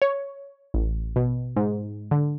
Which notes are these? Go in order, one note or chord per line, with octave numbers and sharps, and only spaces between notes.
C#5
A1
B2
G#2
D3